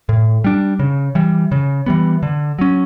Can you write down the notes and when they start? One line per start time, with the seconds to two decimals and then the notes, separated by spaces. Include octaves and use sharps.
0.09 A2
0.44 G3 D4
0.79 C#3
1.15 E3 G3
1.52 C#3
1.86 E3 G3 B3
2.23 D3
2.59 F#3 C#4